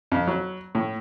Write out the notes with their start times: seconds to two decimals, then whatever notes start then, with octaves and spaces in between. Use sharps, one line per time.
0.12 F2
0.27 F#3
0.75 A2